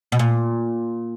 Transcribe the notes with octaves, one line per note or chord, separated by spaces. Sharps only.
B2
A#2